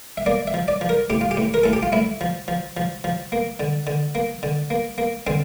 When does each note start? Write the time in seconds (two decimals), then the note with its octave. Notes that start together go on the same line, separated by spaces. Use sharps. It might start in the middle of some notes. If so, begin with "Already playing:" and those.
0.17 E5
0.26 A#3 D5
0.47 E5
0.54 F3
0.68 D5
0.81 F3
0.89 A#4
1.10 A2 G4
1.21 F4
1.31 G4
1.37 A2
1.54 A#4
1.64 A2 A4
1.73 G4
1.83 F4
1.93 A2 E4
2.21 F3
2.48 F3
2.77 F3
3.04 F3
3.32 A#3
3.60 D3
3.87 D3
4.15 A#3
4.43 D3
4.70 A#3
4.98 A#3
5.27 D3 C4